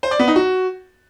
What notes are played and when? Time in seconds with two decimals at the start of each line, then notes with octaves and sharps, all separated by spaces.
0.03 C5
0.11 D5
0.19 B3
0.28 D#4
0.36 F#4